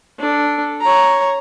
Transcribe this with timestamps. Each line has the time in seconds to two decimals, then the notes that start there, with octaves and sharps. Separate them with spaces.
0.19 D4 A4
0.81 C#5 A#5